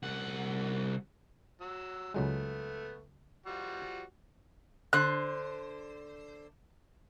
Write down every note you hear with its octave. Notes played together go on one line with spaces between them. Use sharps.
C2 F#5
F#3 E6
C#2 F#3 G#3 A3 B3
F3 G3 F#4
D3 C5 F#6